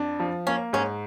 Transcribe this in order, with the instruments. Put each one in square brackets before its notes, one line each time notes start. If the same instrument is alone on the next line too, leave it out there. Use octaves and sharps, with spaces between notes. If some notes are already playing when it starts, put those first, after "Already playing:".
Already playing: [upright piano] F2 D4
F3
[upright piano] A#3 [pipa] C#4
[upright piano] G#2 [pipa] C#4